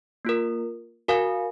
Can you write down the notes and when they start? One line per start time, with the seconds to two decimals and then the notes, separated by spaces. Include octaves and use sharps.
0.25 A#3 F4 A#4
1.08 F#4 A#4 F5 G#5